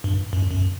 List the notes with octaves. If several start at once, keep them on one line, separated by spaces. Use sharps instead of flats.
G2
F#2
F#2